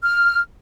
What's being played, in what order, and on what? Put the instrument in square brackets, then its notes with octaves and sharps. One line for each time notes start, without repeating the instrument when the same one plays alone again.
[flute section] F6